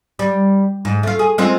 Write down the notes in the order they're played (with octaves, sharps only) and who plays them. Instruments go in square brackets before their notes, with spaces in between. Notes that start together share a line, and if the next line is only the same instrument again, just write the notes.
[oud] G3
G#2
A3 F4
G#4
G#3 C4 F4